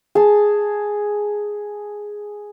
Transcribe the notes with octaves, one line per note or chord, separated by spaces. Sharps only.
G#4 A5